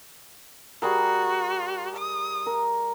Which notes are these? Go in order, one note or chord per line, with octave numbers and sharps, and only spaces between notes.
G3 F#4 G#4 A#4
D#6
A#4